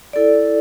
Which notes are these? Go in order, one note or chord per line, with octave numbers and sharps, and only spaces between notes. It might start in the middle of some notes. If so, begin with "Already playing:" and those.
E4 A4 D5